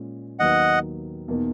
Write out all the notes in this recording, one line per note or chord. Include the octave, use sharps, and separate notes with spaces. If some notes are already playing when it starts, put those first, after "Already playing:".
Already playing: A#2 G#3 C#4
D#2 D#3 F#3 B3 D#5 F#5
E2 B2 A#3 D#4